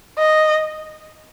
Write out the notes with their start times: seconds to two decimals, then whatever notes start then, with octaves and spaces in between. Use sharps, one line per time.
0.18 D#5